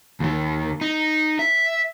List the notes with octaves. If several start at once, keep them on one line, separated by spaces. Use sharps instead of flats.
D#2 D#3
D#4
E5